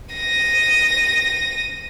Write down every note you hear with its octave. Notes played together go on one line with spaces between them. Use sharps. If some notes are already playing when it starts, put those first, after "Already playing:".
A#6 D#7